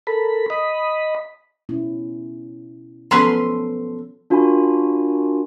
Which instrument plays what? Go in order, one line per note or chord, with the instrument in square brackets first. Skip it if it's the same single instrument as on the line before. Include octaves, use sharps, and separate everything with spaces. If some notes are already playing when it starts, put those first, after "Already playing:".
[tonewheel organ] A4 A#4 B5
D#5 B5
[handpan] B2 C#4 E4
[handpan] F3 B3 A4 [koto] F#3 C#4 B4 [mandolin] C6
[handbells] D4 F4 F#4 A#4 G#5 B5